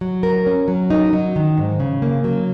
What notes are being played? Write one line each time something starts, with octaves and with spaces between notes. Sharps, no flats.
F#3
A#4
C#4
F#3
D#4
F#3
D#3
G#2
C#3
A#3
F#3